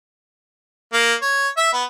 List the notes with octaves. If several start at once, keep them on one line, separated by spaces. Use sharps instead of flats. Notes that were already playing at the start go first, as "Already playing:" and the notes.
A#3
C#5
E5
B3